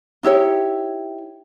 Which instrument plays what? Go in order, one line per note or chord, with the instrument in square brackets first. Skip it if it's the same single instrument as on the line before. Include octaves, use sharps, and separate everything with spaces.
[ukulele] D#4 E4 G4 C#5